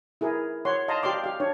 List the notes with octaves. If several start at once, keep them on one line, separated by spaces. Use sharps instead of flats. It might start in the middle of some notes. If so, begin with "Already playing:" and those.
E4 G#4 A#4
C#5 F#5 C6
D#5 F5 A5 A#5 C6
G4 D5 F5 C6 D6
G4 F5
D4 C#5